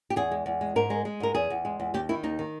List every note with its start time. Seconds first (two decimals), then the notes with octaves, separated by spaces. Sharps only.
0.10 G4
0.16 E2 G#4
0.31 G#3
0.46 E2
0.61 G#3
0.76 G#2 A#4
0.90 G#3
1.05 G#3
1.20 G#2 A#4
1.35 E2 G#4
1.50 E2
1.65 G#3
1.80 E2
1.94 D#2 G4
2.09 D#3 E4
2.23 D#2 D#4
2.39 D#3